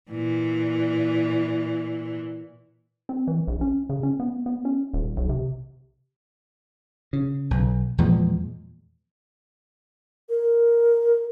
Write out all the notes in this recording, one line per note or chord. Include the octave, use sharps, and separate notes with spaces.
A#2 E3
C4
E3
A#1
C#4
C#3
C#4
B3
B3
C#4
D#1
B1
C3
C#3
B1
E2 A#2 F3 G#3
A#4